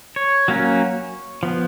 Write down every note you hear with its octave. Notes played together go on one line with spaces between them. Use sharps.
C#5
F#3 A#3 C#4
F3 B3